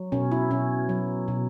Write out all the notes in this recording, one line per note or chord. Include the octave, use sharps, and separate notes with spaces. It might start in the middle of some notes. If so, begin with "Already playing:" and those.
Already playing: F#3
B2 C#4
E4
B2 C#4
F#3
B2